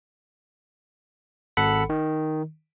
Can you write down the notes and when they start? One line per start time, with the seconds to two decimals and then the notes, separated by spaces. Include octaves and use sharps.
1.57 G#1 A4 F#5 B5 C#7
1.90 D#3